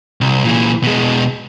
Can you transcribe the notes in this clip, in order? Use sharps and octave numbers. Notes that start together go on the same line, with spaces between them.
C2
A#2 E3
B2 G#3